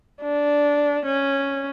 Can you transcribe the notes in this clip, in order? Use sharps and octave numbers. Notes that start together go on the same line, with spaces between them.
D4
C#4